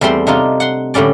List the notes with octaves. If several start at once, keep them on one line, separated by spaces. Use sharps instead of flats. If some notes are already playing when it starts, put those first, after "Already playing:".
E2 G3 A3 C4 C6
C3 D4 D#4 F4
F#5 C6
A2 D3 G3 C#4 D5